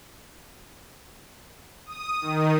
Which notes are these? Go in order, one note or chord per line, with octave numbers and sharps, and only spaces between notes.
D#6
D#3